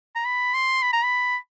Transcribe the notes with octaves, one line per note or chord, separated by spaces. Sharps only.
A#5
B5
C6
B5
A#5
B5